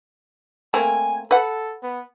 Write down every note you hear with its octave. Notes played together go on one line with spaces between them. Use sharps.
A3 A#3 C4 G#5
A4 B4 F#5
B3